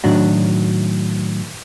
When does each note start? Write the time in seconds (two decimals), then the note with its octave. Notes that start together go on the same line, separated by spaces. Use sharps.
0.04 A2 D#3 F#3 D4 F#4